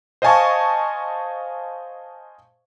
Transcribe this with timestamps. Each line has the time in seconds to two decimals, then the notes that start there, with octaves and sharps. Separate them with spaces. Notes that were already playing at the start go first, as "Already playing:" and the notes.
0.22 C5 D#5 F5 G#5 A5 C#6